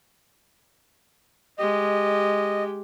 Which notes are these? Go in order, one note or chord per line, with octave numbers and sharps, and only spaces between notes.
G#3 G4 D#5